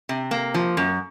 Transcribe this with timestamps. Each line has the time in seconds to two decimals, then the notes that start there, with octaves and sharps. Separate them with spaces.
0.09 C3
0.31 A#3
0.54 F3
0.77 F#2